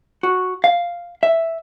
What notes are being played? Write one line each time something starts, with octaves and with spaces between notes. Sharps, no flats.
F#4
F5
E5